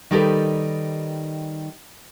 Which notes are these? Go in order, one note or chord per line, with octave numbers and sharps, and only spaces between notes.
D#3 G3 D#4 G4 A4 B4